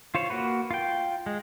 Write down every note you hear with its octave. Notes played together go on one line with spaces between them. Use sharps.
F4 C5 C#5
A#3 F#4 B4
F4 G5
G#3